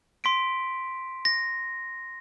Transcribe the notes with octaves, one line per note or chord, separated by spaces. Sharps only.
C6 B6 D7
A#6